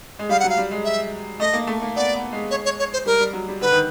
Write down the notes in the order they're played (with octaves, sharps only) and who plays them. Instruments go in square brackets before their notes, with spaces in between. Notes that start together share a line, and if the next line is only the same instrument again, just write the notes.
[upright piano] G#3
[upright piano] G3 [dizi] F5
[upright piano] F#3 [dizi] F#5
[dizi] F5
[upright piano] G3
G#3
[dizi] E5
[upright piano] A3 [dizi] D#5
[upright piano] A#3
A3
A#3
[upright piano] B3 [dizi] D5
[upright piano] B3
G#3
[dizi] C#5
C#5
C#5
C5
[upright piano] G3 [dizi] A#4
[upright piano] G3
F#3
G3
[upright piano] D3 [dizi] B4
[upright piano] D#3